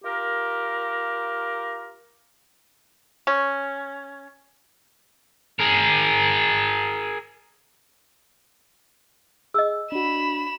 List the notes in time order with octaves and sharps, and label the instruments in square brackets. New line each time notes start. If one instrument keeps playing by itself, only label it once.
[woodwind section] F4 G4 A#4
[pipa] C#4
[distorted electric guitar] G#4 A#4
[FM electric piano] G#4 [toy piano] D#5 E6
[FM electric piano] D4 F#4 [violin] B5 E7